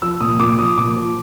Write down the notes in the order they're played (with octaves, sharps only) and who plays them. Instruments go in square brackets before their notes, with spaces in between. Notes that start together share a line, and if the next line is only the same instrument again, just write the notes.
[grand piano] F3 E6
A#2 D#6
A#2 D6
F3 D#6
A#2 D6
F3